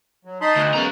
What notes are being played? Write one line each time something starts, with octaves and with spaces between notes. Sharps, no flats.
F#3
D#4 A5 B5 C6
D2
C#3 A#3 B3 C#4 A#5